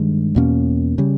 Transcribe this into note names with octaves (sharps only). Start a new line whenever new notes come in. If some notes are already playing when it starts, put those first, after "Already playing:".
Already playing: G2 D#3 G#3
E2 B2 A#3 C#4
C#3 G3